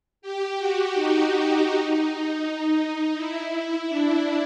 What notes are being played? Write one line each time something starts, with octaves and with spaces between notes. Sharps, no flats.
G4
F#4
D#4
E4
D4